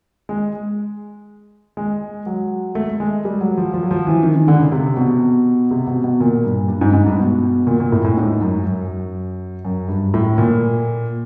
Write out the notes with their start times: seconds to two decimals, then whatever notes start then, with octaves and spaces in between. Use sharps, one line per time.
0.29 G#3
1.77 G#3
2.26 F#3
2.75 A3
2.89 A3
3.00 G#3
3.25 G3
3.41 F#3
3.58 F3
3.74 F3
3.83 F#3
3.91 F3
4.07 E3
4.23 D#3
4.36 D#3
4.48 D3
4.60 C#3
4.72 C3
4.97 B2
5.71 C3
5.87 B2
6.04 B2
6.20 A#2
6.45 G2
6.68 G2
6.81 G#2
6.93 G#2
7.06 G2
7.18 B2
7.67 A#2
7.80 A#2
7.92 A2
8.04 A2
8.17 G#2
8.41 F#2
8.66 F#2
9.65 F#2
9.88 G2
10.14 A2
10.38 A#2